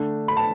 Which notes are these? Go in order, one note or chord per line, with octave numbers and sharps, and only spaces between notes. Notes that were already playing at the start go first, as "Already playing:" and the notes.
Already playing: D3 A3 D4
B5
A5